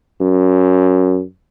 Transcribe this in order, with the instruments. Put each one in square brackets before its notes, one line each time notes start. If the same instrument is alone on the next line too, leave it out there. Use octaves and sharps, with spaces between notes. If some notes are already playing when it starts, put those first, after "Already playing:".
[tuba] F#2